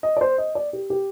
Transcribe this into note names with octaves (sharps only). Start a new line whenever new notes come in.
D#5
D5
C5
D#5
D5
G4
G4